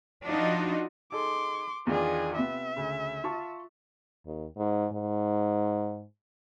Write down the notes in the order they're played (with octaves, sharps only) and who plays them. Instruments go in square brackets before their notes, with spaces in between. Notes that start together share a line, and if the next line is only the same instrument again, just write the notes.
[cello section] F3 D4 D#4 F4 F#4
[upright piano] D#4 G#4 A4 [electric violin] C6 D6
[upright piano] E2 D#3 D4 [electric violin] F4 G#4
[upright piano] C3 B3 [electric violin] E5
[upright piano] D2 C#3
F4 A5 C#6
[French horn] D#2
G#2
G#2